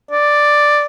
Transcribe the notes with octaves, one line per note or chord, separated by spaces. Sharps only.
D5